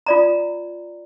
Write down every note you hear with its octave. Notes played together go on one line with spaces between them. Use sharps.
F4 D5 A#5